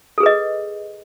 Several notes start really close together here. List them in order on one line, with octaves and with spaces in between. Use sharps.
A4 G#4 B4 D#5